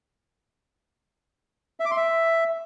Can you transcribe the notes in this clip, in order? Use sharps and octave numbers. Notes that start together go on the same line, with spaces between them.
E5
D6
C6
E5